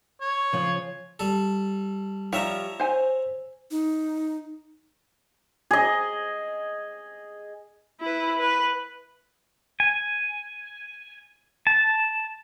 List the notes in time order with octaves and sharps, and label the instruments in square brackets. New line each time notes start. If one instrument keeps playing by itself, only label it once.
[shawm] C#5
[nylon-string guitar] C#3 F3 C5
[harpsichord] G3 A4
[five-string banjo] F3 G3 [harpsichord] C#5 E5 A#5
[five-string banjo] C5 G#5
[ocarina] D#4
[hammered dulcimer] G#4 D#5
[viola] E4 B4
B4
[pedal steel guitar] G#5
A5